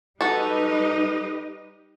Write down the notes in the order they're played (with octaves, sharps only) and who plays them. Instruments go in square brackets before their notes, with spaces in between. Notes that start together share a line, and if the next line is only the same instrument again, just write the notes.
[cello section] G3 D#4 G4 B4 D#5 [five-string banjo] F#4 A4